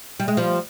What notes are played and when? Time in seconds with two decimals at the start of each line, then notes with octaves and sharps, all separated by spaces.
0.20 G3
0.28 G#3
0.37 F3 G3